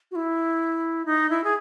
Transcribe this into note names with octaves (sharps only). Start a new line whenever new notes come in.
F#4
E4
D#4
E4
G#4